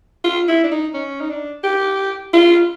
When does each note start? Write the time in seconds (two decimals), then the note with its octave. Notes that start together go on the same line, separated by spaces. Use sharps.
0.24 F4
0.48 E4
0.64 D4
0.72 D#4
0.94 C#4
1.20 D#4
1.30 D4
1.63 G4
2.34 F4